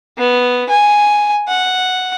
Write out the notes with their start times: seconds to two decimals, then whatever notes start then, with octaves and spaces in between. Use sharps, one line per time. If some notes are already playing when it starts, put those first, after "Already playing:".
0.18 B3
0.69 G#5
1.48 F#5